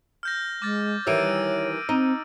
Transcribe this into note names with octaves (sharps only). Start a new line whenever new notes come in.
F6 G6 A#6
G#3 D6 F6 A6
D#3 E3 G3 C#5 E6 D7 D#7
C4 D#4